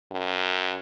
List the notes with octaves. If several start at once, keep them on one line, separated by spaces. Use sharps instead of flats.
F#2